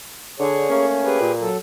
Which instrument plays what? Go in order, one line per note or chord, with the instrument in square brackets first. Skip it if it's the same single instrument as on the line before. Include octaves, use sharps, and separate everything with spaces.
[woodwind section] D3 [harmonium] G#4 C#5
[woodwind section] A3 A#3 C#4
[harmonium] G4 G#4 B4
[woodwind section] A#2
[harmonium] F#3 A4